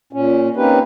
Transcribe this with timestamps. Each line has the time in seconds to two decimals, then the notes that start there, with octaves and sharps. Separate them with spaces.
0.13 A#2 C#4
0.57 A#3 C4 C#4 D#4 G4 B4